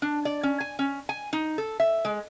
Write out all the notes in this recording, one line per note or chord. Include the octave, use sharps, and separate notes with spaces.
D4
D5
C#4
G#5
C#4
G#5
D#4
A4
E5
G#3